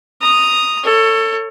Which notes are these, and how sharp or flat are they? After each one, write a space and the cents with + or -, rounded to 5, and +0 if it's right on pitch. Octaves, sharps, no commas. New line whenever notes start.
A#5 +0 D#6 +0
A4 +25 C#5 +0